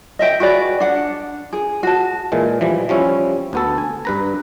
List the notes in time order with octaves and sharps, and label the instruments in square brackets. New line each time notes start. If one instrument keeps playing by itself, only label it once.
[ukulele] D#5 E5 G5
F#4 G#4 B4 D5
D4 F#5
G#4
F#4 A5
[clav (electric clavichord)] A#2 E3 G#3
E3 F3 G3
F3 G3 C#4 E4
D2 B3 A4
G#5
G2 B4 A#5